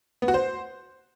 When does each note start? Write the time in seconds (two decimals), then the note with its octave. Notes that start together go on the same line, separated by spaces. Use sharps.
0.22 B3
0.28 F#4
0.34 C5